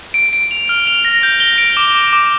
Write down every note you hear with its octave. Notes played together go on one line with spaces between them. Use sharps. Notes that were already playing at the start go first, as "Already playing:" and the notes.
D7
D7
F7
F6
F7
A#6
G6
G7
D7
D6
D6
D6